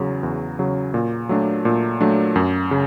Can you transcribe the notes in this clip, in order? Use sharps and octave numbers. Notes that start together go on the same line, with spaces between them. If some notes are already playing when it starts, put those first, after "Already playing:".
Already playing: E2 C#3 F#3
E2
C#3 F#3
A#2
F#3 A3 D4
A#2
F#3 A3 D4
F#2
C#3